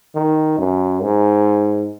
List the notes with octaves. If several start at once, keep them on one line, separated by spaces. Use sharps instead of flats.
D#3
F#2
G#2